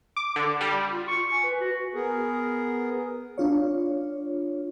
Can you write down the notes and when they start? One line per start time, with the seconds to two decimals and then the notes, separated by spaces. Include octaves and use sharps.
0.16 D6
0.36 D3
0.61 G3
0.90 F4
1.08 C#6
1.31 G#5
1.43 B4
1.61 F#4
1.94 B3 G#4 A#4
3.38 D4 F4 C#5